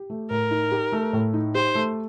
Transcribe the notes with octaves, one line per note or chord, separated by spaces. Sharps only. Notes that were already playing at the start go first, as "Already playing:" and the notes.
Already playing: G4
A3
A2 A#4
D#4
G4
A3
A2
D#4
G4 C5
A3